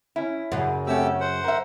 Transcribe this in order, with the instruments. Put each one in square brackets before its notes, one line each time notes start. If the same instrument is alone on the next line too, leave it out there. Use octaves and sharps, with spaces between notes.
[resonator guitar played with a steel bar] C#4 E4
[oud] F#2 C#3
[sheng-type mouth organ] A3 G4 E6 [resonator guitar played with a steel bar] C4 C#4
[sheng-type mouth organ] C5 F#5
[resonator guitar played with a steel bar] A#4 E5